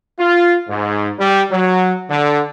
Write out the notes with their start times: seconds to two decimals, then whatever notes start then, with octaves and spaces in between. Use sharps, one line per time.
0.19 F4
0.69 G#2
1.19 G3
1.51 F#3
2.10 D3